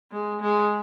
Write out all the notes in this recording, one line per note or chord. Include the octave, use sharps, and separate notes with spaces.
G#3
G#3